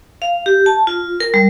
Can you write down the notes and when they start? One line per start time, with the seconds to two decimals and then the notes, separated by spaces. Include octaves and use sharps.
0.22 F5
0.46 G4
0.66 A5
0.87 F4
1.20 A#4
1.34 G3